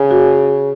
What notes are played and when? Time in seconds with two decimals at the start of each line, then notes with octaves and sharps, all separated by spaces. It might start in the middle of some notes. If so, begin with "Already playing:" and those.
Already playing: C#3
0.11 F#4